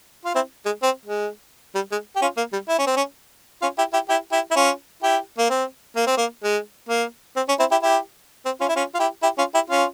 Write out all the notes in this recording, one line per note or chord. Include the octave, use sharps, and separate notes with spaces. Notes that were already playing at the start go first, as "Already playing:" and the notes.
F4
C4 E4
G#3
C4
G#3
G3
G#3
G4
C#4 F4
A#3
G3
E4
C#4
C4
C#4
C#4 F4
E4 G4
E4 G4
E4 G4
E4 G4
E4
C#4 F4
E4 G4
A#3
C4
A#3
C4
A#3
G#3
A#3
C4
C#4
C4 E4
E4 G4
E4 G4
C4
C#4 F4
E4
C#4 F4
F4
E4 G4
E4 G4
C#4 F4
E4 G4
C#4 F4